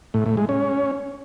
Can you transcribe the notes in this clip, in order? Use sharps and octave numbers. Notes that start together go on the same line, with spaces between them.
A2
A2
G#3
C#4